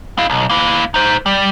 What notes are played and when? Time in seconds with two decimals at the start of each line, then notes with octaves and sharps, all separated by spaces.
0.18 E4 F5
0.30 B1
0.50 A#3 E4
0.94 D#4 C5
1.26 G3